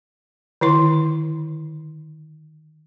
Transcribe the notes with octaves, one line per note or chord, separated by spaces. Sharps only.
D3 D#3 E4 C6